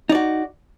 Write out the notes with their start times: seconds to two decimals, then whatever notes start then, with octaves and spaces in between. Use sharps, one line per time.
0.09 D#4
0.12 D5
0.15 F#4